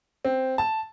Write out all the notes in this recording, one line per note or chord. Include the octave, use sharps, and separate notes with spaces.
C4
A5